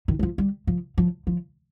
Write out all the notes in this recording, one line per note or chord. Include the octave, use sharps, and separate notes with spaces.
D#3
G3
F3
G3
F3
F3
F3